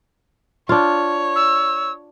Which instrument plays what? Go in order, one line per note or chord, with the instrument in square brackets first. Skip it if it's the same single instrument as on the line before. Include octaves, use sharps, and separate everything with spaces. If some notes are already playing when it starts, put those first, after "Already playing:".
[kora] D4 F4 [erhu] C#5
[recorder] E6